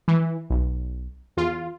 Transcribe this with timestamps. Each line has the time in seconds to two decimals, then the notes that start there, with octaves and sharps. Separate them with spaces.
0.08 E3
0.50 B1
1.37 E2 F4